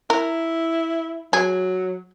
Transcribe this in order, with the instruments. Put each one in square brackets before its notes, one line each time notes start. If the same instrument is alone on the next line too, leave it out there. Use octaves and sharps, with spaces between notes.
[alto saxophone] E4 [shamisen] A#4
[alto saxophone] F#3 [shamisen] G#4